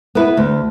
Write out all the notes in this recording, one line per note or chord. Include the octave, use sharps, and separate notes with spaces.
B3 E4 B4
D2